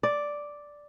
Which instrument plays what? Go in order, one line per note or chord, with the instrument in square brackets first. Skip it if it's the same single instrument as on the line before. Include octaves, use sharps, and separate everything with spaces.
[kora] D5